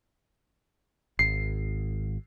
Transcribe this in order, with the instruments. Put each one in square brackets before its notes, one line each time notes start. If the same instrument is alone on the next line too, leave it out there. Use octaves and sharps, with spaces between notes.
[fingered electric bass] G#1 [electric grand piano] C7